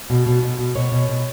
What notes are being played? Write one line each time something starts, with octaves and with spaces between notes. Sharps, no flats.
B2
B2
B2
B2
B2 C#5
B2
B2